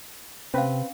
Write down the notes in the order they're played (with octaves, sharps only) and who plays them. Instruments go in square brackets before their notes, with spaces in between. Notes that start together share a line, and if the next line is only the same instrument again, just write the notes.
[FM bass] C3 [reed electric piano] C4 B4 [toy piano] C#4 F5